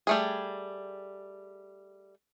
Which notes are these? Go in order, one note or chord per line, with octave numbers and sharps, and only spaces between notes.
G3 A3 G#4